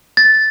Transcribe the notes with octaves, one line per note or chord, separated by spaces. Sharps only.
A6